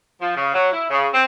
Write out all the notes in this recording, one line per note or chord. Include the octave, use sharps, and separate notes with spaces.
F3
C#3
F#3
E4
C#3
C4